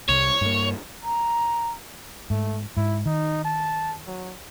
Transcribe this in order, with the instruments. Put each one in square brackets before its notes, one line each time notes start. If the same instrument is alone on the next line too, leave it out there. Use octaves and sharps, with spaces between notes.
[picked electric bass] C2 [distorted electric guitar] C#5
[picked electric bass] G2 A#3
[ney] A#5
[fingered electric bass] G#2 [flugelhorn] A3
[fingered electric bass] G#2 [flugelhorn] E4
[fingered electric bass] D#3 [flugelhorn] D#4
[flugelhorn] A5
F#3